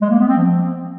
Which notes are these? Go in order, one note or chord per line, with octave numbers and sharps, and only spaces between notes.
G#3
A#3
B3
C4
F3